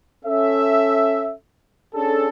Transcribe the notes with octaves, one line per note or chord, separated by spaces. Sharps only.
C#4 A4 E5
C#4 D4 G#4 A4